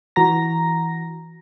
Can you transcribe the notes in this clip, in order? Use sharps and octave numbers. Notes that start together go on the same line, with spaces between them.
E3 F#4 A#5 A#6